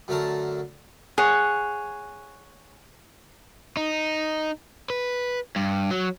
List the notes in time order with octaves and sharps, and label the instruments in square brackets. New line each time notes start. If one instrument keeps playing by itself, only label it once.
[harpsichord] F#2 D3 A3 A#4 A5
[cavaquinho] G#4 C#5 F#5
[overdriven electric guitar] D#4
B4
G2
F#3